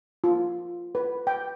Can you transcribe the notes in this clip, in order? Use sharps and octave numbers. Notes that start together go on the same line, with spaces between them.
F4
B4
G5